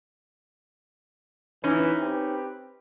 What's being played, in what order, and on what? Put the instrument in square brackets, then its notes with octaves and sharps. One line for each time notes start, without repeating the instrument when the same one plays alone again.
[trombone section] E3 [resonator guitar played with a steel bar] C#4 D#4
[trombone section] C4 G4 B4